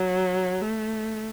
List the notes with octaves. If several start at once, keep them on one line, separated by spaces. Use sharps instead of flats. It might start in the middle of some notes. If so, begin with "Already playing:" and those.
Already playing: F#3
A3